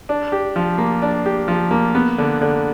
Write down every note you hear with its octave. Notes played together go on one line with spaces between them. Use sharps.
D4
G4
F3
A#3
D4
G4
F3
A#3
B3
D3
D3